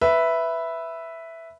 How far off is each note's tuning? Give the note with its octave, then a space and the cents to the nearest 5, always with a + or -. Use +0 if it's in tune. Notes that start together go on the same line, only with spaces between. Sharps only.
B4 +0 E5 +0